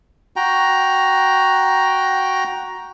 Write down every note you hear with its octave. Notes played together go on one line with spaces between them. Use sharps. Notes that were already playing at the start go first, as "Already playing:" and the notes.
F#4 G5 A#5